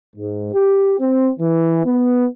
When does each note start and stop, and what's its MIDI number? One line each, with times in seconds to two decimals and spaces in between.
0.16 0.50 44
0.52 0.94 67
0.99 1.29 60
1.39 1.82 52
1.85 2.26 59